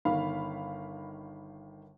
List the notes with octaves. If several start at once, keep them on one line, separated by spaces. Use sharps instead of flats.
G1 D#3 F5 B5